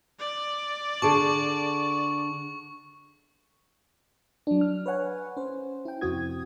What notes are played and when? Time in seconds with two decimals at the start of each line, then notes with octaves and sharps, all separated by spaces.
0.19 D5
1.02 D3 G#4 A5 C#6
4.47 F#3 D4
4.61 F6
4.86 B4 C#5 F#5 G#5
5.37 C#4 C5
5.85 E4 G5
6.01 F2 C3 C4 F#4 D#6 G#6